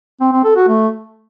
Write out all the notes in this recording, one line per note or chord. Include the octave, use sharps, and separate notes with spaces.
C4
C4
A4
F#4
A3